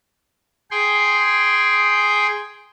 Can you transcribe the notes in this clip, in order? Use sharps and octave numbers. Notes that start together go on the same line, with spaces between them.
G#4 G5 C6